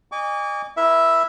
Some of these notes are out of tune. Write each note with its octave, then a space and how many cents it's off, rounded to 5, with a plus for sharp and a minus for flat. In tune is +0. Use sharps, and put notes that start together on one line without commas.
D#5 -35 G#5 -30 D6 -45
E4 +0 A#4 +35 E5 +0